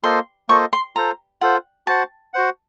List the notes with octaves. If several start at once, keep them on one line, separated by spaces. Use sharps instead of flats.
A#3 F4 A4 C5 D#5 C6
A#3 F4 A4 C5 D#5 C#6
C6
F4 A4 C5 A#5
F4 A4 C5 F#5
F#4 C5 F#5 A5
F#4 C5 F#5